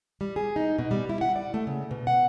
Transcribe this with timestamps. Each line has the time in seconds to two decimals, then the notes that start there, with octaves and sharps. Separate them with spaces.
0.21 G3
0.36 G#4
0.56 D#4
0.79 B2
0.91 G3
1.09 E4
1.21 F#5
1.36 D5
1.54 A3
1.67 C#3
1.91 B2
2.07 F#5